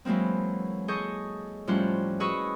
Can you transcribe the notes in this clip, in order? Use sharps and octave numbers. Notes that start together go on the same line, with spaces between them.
E3 F#3 G#3 A#3 C4
G#4 A4 D#5 C#6 G6
A2 F3 G3 C#4 C6 F#6
F#4 G#4 B4 D#5 C#6 E6